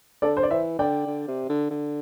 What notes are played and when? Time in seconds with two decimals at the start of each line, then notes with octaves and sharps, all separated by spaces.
0.22 D3 A4 D5
0.37 C5
0.43 D5
0.50 E3 C5 E5
0.79 D3 D5 G5
1.07 D3
1.28 C3
1.49 D3
1.70 D3